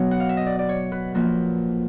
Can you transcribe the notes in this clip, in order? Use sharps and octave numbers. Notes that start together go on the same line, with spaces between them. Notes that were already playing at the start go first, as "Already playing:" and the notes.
Already playing: B2 F#3 B3 C#5
F#5
F5
E5
D#5
D5
D5
C#5
B4
A#2 F3 A#3 B4